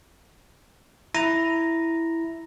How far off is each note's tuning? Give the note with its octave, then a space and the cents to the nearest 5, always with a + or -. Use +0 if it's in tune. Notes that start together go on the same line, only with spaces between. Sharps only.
E4 +0 A#5 +0